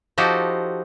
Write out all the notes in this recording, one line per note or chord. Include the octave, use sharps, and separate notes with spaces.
F3 D#4 F#4 G4 A4 C5